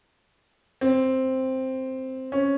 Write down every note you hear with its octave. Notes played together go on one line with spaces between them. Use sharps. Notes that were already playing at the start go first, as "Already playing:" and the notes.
C4
C#4